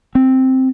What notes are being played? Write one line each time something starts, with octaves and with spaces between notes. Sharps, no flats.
C4